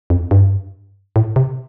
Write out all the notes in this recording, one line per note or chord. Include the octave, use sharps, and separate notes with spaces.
F2
G2
A2
C3